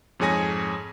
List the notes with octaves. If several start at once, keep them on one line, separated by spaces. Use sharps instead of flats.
F2 G#2 G#4 C#5 G#5 A#6